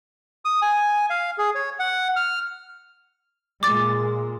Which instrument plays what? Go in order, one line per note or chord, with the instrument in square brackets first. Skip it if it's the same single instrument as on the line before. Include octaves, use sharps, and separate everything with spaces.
[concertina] D#6
G#5
F5
G#4
C#5
F#5
F6
[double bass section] A#2 G#3 [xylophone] D6 A6